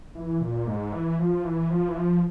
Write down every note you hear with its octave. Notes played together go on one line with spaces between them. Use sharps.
E3
A#2
G#2
E3
F3
E3
F3
E3
F3